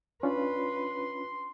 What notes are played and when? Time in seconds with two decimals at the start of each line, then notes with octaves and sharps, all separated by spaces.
0.23 C#4 D4 F4 B4 C6